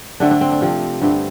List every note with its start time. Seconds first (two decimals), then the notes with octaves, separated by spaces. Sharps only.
0.20 D3 A3 C4 D4
0.31 D4
0.41 C4
0.52 D4
0.61 C3 F3 C4
1.02 G2 D3 A3 C4